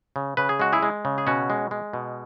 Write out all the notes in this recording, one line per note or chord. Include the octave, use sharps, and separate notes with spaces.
C#3
C#3 B4
G#4
G#3 F#4
E4 G#4
G#3
C#3
G#4
B2 C#4 F#4
G#3
G#3
B2